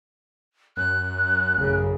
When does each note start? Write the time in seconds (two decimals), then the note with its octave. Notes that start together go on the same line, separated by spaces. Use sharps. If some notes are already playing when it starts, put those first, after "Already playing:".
0.77 F#2 F#6
1.57 A1 F#2 C#3